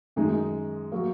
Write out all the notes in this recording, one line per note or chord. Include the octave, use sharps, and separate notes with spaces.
F#2 D#3 G#3 D#4
F#3 A#3